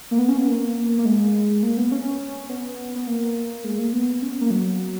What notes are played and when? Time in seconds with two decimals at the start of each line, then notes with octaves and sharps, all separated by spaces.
0.11 A#3
0.19 B3
0.28 C#4
0.38 B3
0.47 A#3
0.98 A#3
1.05 G#3
1.63 A#3
1.77 B3
1.92 C#4
2.50 B3
2.96 B3
3.07 A#3
3.64 G#3
3.79 A#3
3.93 B3
4.22 C#4
4.41 A#3
4.51 F#3